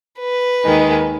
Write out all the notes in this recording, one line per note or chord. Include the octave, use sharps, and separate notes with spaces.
B4
D#2 D#3 G#3